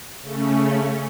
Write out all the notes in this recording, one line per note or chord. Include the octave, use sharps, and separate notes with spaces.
C#3 A3 C#4